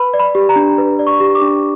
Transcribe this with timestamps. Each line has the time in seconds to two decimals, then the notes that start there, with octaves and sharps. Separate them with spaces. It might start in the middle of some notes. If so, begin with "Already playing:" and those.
Already playing: B4 B5
0.14 D5
0.20 B5
0.35 G4
0.49 A#5
0.56 D4
0.78 B4
0.99 D5
1.07 C#6
1.20 G4
1.35 D6
1.41 D4